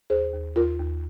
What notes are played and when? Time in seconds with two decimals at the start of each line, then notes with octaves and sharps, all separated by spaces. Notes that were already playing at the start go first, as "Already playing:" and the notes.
0.10 D#2 G#4 C5
0.33 D#2
0.56 D#2 F4 A#4
0.80 D#2